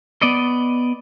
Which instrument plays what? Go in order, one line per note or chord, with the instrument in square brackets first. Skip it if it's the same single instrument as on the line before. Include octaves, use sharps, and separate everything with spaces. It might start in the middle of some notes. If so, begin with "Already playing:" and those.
[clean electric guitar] B3 D5 D#5